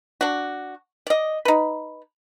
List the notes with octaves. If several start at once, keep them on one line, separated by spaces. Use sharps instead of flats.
D4 F#4
D5 D#5
D#4 B4